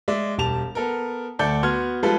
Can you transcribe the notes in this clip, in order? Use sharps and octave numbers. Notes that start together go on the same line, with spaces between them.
G#3 D5 E5
E1 G3 A5 F7
B3 A4 A#4
D2 A3 A4 D5 G6
B3 F#4 C6 F6 G#6
F3 G3 G#3 F4 A4 B4